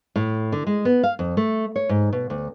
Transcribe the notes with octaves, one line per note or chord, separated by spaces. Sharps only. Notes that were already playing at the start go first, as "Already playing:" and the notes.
A2
D3
G#3
B3
F5
F2
A3
C#5
G#2
B2
D2